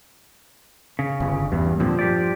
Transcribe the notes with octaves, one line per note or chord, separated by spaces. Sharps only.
C#3
G1
E2 G2
A#2 D3 F3 C4
G2 G4 D5